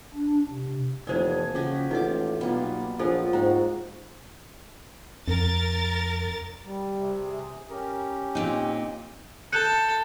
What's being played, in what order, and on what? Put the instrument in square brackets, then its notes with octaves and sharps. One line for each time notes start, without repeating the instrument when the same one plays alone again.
[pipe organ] D4
C3
[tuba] F1 [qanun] E3 A#3 [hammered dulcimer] G#4 G#5 A5 [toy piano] C5 D5
[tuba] C#3 [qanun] F3 F#4 D#5 [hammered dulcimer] G4
[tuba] A1 [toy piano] D#4 D#5 F#5 [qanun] F4 D6
[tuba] B1 [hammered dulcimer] G3 A#3 [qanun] B3 F4
[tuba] A#1 [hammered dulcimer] F3 F#3 [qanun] F4 [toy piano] A4 C5 G#5
[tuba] G#2 [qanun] F#4 [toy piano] C5 G5 A#5
[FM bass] F2 [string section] A#4 A6
[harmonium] G3
[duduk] C3
[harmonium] G#4
[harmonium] C#4 G4 [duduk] A#4
[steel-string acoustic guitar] A#2 D#4 [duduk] C4
[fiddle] A4 [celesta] F#6 G6 C#7